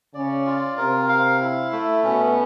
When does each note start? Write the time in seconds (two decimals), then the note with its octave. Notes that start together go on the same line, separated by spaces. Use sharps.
0.14 C#3 C#4 D5
0.46 F4
0.77 C3 C4 A#4
1.09 F5
1.41 E4
1.72 A3
2.03 B2 B3 C#4